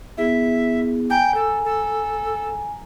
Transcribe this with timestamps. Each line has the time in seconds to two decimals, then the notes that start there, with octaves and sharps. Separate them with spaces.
0.17 B3 E4 G#4 E5
1.10 G5 G#5 A#5
1.35 A4
1.64 A4